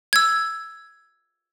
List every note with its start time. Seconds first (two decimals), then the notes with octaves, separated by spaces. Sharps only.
0.13 E6 G#6